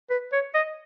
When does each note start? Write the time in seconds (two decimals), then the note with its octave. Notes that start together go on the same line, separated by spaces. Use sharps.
0.10 B4
0.32 C#5
0.54 D#5